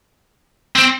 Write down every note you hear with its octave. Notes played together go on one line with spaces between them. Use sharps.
C4